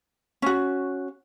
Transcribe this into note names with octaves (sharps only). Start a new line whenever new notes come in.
C#4 F#4